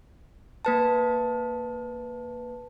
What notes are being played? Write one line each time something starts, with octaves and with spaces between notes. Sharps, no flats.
A#3 B4 A5